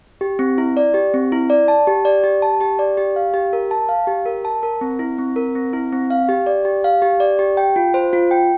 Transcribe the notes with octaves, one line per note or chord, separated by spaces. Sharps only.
G4
C4
E4
D5
G4
C4
E4
D5
A5
G4
D5
G4
A5
G4
D5
G4
F5
G4
A#4
A5
F5
G4
A#4
A5
A#4
C4
E4
C4
A#4
C4
E4
C4
F5
G4
D5
G4
F5
G4
D5
G4
G5
F4
C5
F4
G5